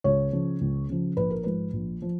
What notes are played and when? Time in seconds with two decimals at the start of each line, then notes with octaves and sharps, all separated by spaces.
0.04 C#2 C#5
0.33 C#3 F3
0.61 C#2
0.89 C#3 F3
1.17 A#1 B4
1.30 A#4
1.44 G#2 F3 B4
1.73 A#1
2.02 F3